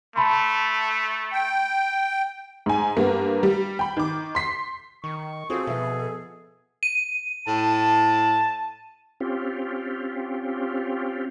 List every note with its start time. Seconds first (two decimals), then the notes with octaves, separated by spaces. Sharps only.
0.16 A3 A5 B5 C6
1.33 G5
2.66 G#2 G#5
2.96 G2 A#3 B3
3.43 G3
3.79 G5 B5
3.97 D#3 D6
4.35 C6 B6 C7
5.04 D#3 C#6
5.50 C4 F4 F#4 G#4 A4 C5
5.67 B2 F3 B3 E5
6.83 D#7
7.48 A2 A5
9.21 C4 C#4 F4 G4